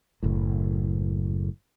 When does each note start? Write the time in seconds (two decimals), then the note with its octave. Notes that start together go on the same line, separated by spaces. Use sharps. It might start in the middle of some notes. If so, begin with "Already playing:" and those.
0.23 F#1 A2